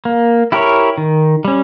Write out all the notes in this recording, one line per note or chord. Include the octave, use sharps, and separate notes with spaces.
A#3
E4 G4 A#4 C#5
D#3
G3 C#4